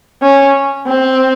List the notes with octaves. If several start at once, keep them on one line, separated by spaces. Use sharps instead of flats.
C#4
C4